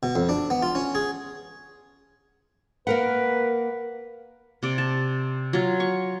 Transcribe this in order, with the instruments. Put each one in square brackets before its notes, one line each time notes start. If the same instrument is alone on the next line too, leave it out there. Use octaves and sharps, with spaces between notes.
[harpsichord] B2
F2
D4
B3
F4
C#4
G#4
[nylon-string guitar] A#3 A#4 F#5 [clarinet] B4
[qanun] C3 D5
A5
F#3 F4
C#6